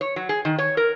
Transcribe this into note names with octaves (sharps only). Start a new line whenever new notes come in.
C#5
F#3
G#4
D#3
C#5
A#4